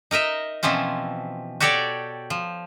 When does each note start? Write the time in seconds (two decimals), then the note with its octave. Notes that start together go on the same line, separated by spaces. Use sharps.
0.11 D#4 A#4 D#5 E5
0.63 B2 E3 F3 C4 C#4
1.60 F#4 G4 A4 C#5 D5 G5
2.30 F3